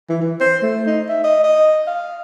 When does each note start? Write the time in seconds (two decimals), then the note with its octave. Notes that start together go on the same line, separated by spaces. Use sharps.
0.09 E3
0.22 E3
0.40 C5
0.62 A3
0.86 D#4
1.09 E5
1.24 D#5
1.44 D#5
1.87 F5